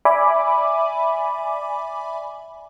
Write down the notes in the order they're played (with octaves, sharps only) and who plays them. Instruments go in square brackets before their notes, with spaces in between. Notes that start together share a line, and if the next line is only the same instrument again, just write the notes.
[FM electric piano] D5 E5 G#5 B5 D6